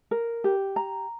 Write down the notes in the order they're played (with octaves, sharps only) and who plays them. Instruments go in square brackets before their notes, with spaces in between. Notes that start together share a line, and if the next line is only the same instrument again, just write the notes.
[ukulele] A#4
G4
A#5